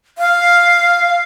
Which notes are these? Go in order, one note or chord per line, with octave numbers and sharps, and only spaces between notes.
F5